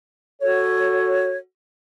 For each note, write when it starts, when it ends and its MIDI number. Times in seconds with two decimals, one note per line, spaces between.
0.42 1.37 66
0.42 1.37 69
0.42 1.37 73